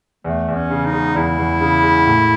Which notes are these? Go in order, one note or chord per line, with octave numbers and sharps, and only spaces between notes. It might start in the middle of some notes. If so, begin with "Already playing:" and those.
E2 A3
E2
C#4
C#3
D#4
G#3
E2 E4
E2
C#3
G#3
A2